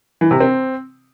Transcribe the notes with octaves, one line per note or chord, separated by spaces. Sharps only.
E3
C3
C4